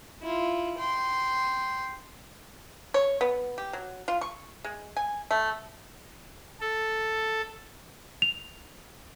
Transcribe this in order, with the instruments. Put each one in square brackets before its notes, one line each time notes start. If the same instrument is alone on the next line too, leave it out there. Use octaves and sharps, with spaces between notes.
[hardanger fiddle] E4 F4
G5 C6
[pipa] C#5
B3
G4
F#3
F4
C#6
G#3
G#5
A3
[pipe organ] A4
[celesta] F7